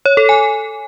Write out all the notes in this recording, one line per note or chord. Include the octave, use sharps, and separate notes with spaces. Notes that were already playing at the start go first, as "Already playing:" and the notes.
C#5
A4
G#5